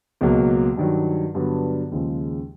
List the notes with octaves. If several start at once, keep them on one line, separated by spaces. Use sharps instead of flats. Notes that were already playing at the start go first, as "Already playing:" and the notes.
C#2 B2 F#3 A#3
G2 D#3 F#3
G2 D3 F#3 B3
D#2 C#3 F3 G#3